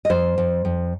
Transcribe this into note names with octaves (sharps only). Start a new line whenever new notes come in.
D#5
F2 C5
F2
F2